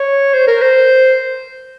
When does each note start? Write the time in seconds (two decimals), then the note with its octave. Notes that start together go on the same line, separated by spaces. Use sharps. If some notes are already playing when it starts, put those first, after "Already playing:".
Already playing: C#5
0.34 C5
0.48 A#4
0.62 C5